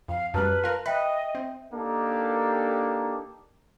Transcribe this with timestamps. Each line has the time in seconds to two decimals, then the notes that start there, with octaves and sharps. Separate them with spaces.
0.08 F2 F5
0.34 F#2 G3 B4 A5 A#5 F6
0.64 F4 A#4
0.86 B4 D#5 E5 G5
1.35 C4
1.73 A#3 D4 D#4 G4 A4